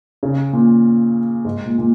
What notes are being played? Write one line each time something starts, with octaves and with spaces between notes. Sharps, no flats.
C#3
A#2
G#2
A#2
A#2